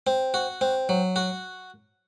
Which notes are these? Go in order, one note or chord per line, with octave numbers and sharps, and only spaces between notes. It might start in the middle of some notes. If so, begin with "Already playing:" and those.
C4
F#4
C4
F#3
F#4